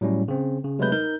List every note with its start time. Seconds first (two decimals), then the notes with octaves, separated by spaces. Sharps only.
0.01 A2 F#3 G3 C#4
0.28 C#3 C4
0.64 C#3
0.79 C3 F#3 G#3 A3 B4 G6
0.92 D#4 A#4 G6